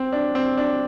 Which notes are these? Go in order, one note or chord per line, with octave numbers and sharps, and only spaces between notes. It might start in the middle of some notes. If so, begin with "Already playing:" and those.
Already playing: C4
D4
C4
D4